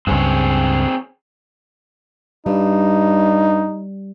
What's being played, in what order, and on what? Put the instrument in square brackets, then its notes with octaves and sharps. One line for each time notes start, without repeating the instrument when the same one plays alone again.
[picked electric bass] C#2 G2 [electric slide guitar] C4 G#4 C#5
[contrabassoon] G2 [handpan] G3 [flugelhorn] D#4